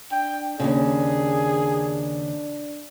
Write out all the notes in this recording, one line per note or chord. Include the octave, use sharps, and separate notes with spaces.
D4 G5
D#2 G#2 C#3 D4 G#4